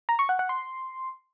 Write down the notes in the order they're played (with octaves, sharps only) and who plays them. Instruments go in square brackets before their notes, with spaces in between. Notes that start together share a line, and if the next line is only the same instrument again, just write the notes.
[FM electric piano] A#5
C#6
F#5
F#5
C6